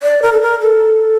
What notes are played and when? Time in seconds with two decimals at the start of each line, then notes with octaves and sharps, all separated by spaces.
0.03 D5
0.22 A#4
0.33 A4
0.41 A#4
0.60 A4